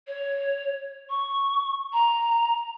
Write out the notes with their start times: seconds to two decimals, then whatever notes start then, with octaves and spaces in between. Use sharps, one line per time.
0.07 C#5
1.10 C#6
1.93 A#5